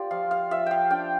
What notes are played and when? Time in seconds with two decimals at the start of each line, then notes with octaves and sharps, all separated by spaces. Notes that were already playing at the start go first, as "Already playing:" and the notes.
Already playing: A#3 F4 G4 C5 D5
0.11 F3 F5
0.31 F5
0.51 F3 E5
0.66 F5 G5
0.90 D4 G5